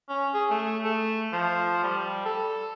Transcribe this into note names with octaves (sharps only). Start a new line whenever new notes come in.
C#4
G#4
A3
A3
F3
G3
A4